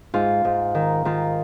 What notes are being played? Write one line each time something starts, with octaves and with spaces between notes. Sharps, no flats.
G#2 F4
G#2
D#3
D#3 F4